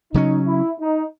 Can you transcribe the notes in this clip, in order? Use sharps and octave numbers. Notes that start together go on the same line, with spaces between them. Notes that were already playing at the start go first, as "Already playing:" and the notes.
C#3 F#3 C#4 D#4
E4
D#4